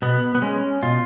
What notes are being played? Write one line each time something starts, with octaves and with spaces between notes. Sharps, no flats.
B2 B3
B3
G#3 C#4
B2 F4